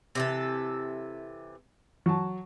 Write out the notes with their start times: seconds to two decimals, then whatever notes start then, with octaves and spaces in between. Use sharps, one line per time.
0.15 C3 E3 A4
2.06 F#3 A5